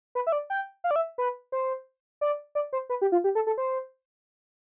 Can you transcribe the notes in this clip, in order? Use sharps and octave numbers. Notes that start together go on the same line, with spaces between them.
B4
E5
D5
G5
F5
D5
E5
B4
C5
D5
D5
C5
B4
G4
F4
G4
A4
A4
C5